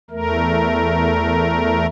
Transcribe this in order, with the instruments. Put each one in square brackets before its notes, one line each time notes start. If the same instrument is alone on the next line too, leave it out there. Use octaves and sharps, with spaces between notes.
[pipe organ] E2 A3 A#4